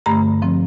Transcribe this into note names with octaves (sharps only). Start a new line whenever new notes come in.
G2 D3 A3 A#5
F3 C4